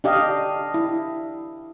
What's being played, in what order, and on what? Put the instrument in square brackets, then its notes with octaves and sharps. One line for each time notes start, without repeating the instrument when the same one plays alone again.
[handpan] D4 G4 D#5 F5
E4